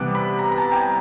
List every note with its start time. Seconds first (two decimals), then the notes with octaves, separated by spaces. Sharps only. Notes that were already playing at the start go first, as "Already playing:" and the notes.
Already playing: C3 E3 G3 B3 D6 F#6
0.15 B5
0.39 A#5
0.52 A#5
0.58 A5
0.72 G5
0.76 G#5